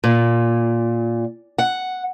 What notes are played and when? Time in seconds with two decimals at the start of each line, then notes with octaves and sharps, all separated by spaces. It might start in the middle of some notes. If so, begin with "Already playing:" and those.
0.04 A#2
1.58 F#5